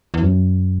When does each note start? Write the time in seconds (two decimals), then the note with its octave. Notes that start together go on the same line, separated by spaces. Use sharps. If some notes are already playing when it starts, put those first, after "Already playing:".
0.14 E2
0.22 F#2